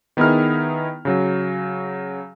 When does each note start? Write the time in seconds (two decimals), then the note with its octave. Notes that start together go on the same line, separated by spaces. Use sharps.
0.17 D#3 B3 D#4 E4 G#4 F6
1.05 C#3 F#3